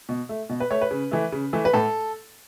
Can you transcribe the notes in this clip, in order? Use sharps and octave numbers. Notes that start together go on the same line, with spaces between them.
B2
A3
B2
B4
A3 C#5
B4
C#3
E3 A3
C#3
E3 A3
B4
A2 A4